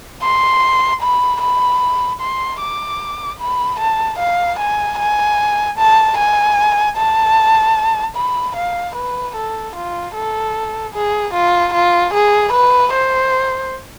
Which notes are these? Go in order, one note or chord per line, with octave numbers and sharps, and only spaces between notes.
C6
B5
B5
C6
D6
B5
A5
F5
G#5
G#5
A5
G#5
A5
B5
F5
B4
A4
F4
A4
G#4
F4
F4
G#4
B4
C5